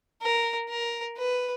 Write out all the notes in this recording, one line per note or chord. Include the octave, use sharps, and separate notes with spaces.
A#4
A#4
B4